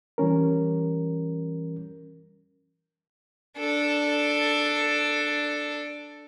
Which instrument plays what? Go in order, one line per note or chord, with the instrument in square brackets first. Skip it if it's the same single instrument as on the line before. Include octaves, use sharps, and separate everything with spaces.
[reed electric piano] E3 G3 C#4 A#4
[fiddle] D4 A4